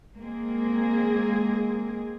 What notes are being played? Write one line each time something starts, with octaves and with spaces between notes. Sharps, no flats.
G#3 A#3 C4 G#4